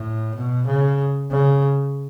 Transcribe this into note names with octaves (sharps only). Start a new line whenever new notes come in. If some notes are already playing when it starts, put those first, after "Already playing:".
Already playing: A2
B2
C#3
C#3